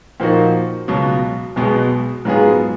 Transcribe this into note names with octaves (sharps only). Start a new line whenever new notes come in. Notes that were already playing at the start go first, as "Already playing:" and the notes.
A#2 F3 A#3 D#4 F#4
C#2 B2 F#3
B1 B2 G#3 B3
G#2 F#3 B3 F4 G#4